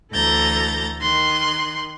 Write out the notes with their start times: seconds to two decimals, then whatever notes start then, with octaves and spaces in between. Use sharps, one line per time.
0.12 D2 E3 A4 A#5 G6 A6
1.01 D#3 C6 F#6